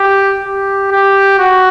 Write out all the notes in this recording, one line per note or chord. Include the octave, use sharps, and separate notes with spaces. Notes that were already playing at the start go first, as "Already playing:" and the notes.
Already playing: G4
G4
G4
F#4